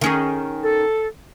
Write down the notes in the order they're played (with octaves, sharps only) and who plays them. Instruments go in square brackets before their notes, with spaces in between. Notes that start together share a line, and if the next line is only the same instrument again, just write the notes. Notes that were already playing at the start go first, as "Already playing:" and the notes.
[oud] D#3 C#4 G#4
[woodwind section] A4